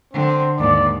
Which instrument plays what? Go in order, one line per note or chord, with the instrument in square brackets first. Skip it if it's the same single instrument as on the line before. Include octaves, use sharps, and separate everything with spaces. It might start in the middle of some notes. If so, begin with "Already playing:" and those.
[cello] D3 [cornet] C4
[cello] D#2 G#2 [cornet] D5